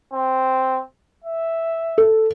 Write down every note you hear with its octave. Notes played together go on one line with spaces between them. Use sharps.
C4
E5
A4